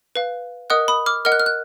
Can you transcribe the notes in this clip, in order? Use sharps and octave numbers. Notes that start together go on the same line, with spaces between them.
B4 F5
A#4 D#5 F#5 D#6 F#6
B5 D#6
D6 F6
A#4 D#5 F#5 F6
F#6
F6
F#6